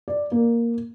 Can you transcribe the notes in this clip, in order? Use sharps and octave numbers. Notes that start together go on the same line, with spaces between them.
D5
A#3